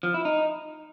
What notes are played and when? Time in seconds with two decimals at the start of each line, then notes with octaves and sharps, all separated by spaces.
0.03 F3
0.14 E4
0.25 D#4